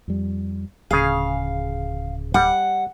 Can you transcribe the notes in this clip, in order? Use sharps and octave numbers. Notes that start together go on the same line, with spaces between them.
F2 G3
D1 C#3 G#4 F5
G3 F#5